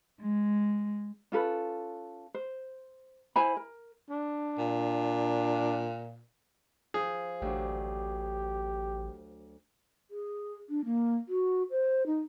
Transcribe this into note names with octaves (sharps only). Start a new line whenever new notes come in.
G#3
C#4 F4 A4 B4
C5
E4 C5 G#5 B5
A#4
D4
A#2
F3 G#4
A1 D2 F#3 G4
G#4
D4
A#3
F#4
C5
D#4